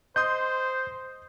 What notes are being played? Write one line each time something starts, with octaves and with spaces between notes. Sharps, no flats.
C5 D#5 C6 D#6 G6